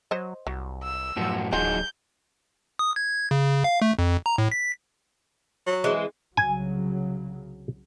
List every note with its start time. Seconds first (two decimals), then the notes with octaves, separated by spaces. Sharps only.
0.11 F#3 C5 D#5
0.47 C2 F#3
0.83 E6
1.16 F#2 A2 F3 F#4
1.53 D1 F#3 D#4 F4 F#4 G#4 G6
2.79 D#6
2.96 G#6
3.31 C#3
3.64 F5
3.82 A3
3.99 F2
4.26 A#5
4.38 A2
4.52 B6
5.67 F#3
5.84 E3 G#3 C4
6.37 C2 C#3 F#3 G#5